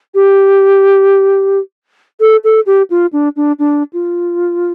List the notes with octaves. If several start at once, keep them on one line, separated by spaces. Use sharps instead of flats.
G4
A4
A4
G4
F4
D4
D4
D4
F4